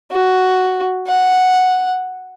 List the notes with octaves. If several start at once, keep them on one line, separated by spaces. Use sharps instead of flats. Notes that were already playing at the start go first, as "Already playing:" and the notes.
F#4
F#5